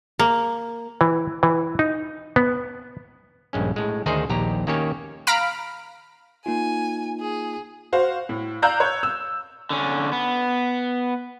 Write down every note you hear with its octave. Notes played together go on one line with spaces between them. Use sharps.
A#3
E3
E3
D#4
B3
A#1 G2 G#3 C#4
A2 G#3
D2 D#3 D#4 G#4 C5
A#1 D#2 G4 A#5
D#3 A#3 C#4 G4 C#5
F5 A#5 B5 F6 D7
A#3 D#4 F4 G#5
G#4
F#4 C5 F5
A2
D5 F5 A#5 E6 F#6 G6
C#5
E6
D3 C#4
B3